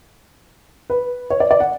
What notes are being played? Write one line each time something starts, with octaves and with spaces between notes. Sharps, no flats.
B4
C#5
D5
D5
F#5